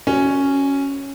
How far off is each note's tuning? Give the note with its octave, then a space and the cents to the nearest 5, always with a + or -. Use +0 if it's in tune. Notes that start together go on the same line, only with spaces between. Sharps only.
C#4 +0 F#4 +0